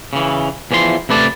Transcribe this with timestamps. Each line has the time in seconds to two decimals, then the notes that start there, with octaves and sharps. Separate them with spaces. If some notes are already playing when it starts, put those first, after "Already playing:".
0.13 C#3 E3
0.71 E2 E3 F3 D5 C6
1.09 C3 A3 B4 D5 A5